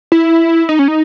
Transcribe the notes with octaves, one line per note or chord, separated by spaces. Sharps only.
E4
D#4
C#4
D#4